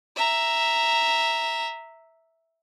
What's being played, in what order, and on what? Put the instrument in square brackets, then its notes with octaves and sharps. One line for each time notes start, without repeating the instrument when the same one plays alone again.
[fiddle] E5 A#5